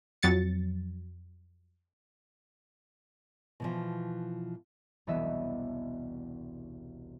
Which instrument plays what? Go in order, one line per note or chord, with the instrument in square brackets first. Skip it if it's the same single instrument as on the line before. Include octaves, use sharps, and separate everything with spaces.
[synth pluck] F2 F#3 A6 C#7
[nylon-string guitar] B2 E3 F3
[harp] E1 C2 E3 B3 D#5 E5